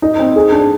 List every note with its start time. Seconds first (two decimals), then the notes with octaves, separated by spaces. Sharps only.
0.02 D#4
0.19 C4
0.36 G#4
0.52 D4